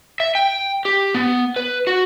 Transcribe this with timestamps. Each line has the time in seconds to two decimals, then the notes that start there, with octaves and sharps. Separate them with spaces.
0.20 E5
0.35 G5
0.85 G4
1.14 B3
1.56 B4
1.87 F#4